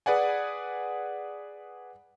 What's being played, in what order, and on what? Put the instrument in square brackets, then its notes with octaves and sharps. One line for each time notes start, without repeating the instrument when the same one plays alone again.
[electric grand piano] G#4 B4 D5 F#5 G#5